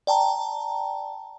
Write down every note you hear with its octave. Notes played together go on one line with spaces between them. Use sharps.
D5 G5 A5 A#5